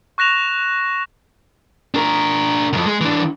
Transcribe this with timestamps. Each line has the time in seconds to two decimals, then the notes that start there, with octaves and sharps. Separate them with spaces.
0.18 C#6 F#6 A#6 E7 F7
1.94 D4 A#4
2.73 C2 F2
2.86 G#3
3.01 E3 D4